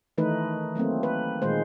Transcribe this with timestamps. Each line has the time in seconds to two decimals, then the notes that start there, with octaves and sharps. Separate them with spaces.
0.18 D#3 E3 A3 D#4 B4
0.75 F#3 A3 A#3 C4
1.03 B4
1.42 A#2 D#3 G#3 C5